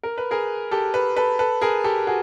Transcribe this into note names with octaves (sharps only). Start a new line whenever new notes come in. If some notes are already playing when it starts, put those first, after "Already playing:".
A#4
B4
G#4 A#4
G4 A4
A4 B4
A4 B4
A4 B4
G#4 A#4
G4 A4
F#4 G#4